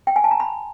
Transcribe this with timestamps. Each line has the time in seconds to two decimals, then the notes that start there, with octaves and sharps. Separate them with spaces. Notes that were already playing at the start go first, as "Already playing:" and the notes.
0.07 G5
0.16 G#5
0.24 A5
0.31 A#5
0.40 B5